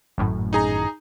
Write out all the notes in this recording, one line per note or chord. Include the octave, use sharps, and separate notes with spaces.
G#1 F#2 A2
D#4 G#4 A#5